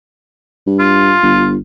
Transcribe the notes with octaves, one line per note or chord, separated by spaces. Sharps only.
G2
F4
G1